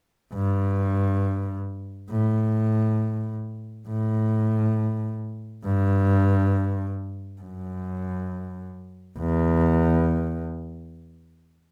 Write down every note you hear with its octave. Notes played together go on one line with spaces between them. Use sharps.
G2
A2
A2
G2
F#2
E2